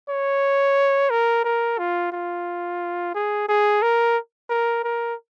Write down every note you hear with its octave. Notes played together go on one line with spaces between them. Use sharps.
C#5
A#4
A#4
F4
F4
G#4
G#4
A#4
A#4
A#4